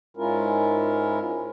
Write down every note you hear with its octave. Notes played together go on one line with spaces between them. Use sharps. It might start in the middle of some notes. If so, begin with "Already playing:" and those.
G#2 G#3 C#4 E4 F4 A#4